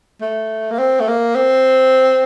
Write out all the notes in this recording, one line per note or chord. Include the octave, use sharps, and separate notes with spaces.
A3
A#3
C4
A3
A#3
C4